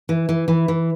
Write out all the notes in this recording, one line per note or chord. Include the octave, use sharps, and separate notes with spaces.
E3
E3
E3
E3